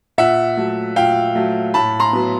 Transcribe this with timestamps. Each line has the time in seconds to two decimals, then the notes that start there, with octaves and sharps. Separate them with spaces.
0.18 A#2 E5 F#5
0.57 F#3 A3
0.96 A#2 F5 G5
1.35 F#3 A3
1.74 A2 A5 B5
2.00 A#5 C6
2.13 F#3 B3